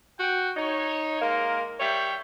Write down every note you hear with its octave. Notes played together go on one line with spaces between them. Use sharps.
F#4 G5
D#4 C#5
G#3 A#3 A#4
G3 C#5 E5 G5